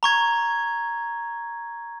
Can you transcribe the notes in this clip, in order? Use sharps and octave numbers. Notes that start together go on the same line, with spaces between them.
A#5 C#6 G#6